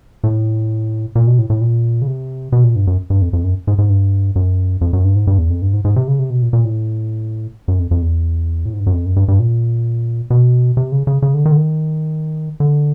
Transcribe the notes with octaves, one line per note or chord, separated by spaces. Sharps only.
A2
A#2
B2
A2
A2
A#2
C#3
C3
B2
A#2
G2
F#2
G2
F2
F2
F#2
G#2
G#2
G2
F#2
F2
F#2
G2
G#2
G2
E2
F2
G2
G#2
G#2
C3
C#3
C3
B2
A#2
A#2
A2
F#2
F2
F2
E2
A2
G#2
G2
F#2
F2
F#2
G2
G2
A#2
B2
C3
C#3
C#3
C#3
D3
D#3
D3
D#3
D3